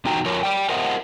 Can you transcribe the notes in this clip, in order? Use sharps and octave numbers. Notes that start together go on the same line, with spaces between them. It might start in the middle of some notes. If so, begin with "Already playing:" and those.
E2 B2 D#4 F#4 G5 A#5
F2 F3 A#4 C#5
D5 G5
A#4 C5 D#5 E5 F#5